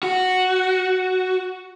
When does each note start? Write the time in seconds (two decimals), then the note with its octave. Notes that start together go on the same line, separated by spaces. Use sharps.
0.03 F#4